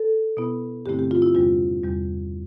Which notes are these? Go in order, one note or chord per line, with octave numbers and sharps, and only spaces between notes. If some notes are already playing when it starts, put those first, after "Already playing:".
Already playing: A4
B2 B3 E4
G2 D3 A3 C4 E4 G4
G4
F4
E4
E2 C3 G3 D4 F4
E2 C3 G3